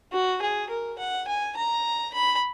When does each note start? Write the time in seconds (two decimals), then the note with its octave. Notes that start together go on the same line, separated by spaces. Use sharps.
0.12 F#4
0.42 G#4
0.69 A#4
0.98 F#5
1.27 G#5
1.56 A#5
2.13 B5